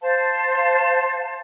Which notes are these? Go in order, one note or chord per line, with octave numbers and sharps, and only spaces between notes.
C5 F5 A5